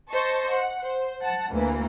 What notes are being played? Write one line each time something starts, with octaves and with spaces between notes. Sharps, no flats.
C5 D#5 A5 C#6
F#5
C5
F#5 A5
D2 E3 A#3